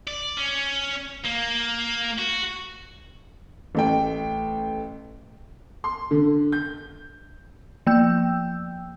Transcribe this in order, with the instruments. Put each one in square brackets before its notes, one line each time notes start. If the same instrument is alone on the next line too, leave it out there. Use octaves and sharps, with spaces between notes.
[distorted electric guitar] D5
C#4
A#3
F#4
[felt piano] A1 A3 G5
[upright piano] C6
D3
G6
[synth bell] F3 A#3 G5 E6 G6